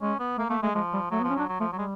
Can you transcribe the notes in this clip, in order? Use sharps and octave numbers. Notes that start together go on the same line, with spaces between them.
G#3 C#4
B3
A3 A#3
A3 A#3
G#3 A3
F3 G#3
G3
F#3 A3
B3
F3
C#4
F#3 D4
F#3
F3 A3
F#3 G3
G#3